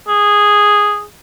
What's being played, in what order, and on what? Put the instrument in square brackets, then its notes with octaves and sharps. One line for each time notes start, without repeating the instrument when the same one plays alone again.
[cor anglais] G#4